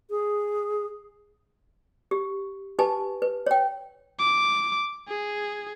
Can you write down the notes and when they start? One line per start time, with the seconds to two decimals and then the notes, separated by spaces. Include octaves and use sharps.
0.10 G#4
2.11 G4
2.79 D#4 G4 B4 G#5 A5
3.22 B4
3.47 C#5 G5
4.19 D6
5.08 G#4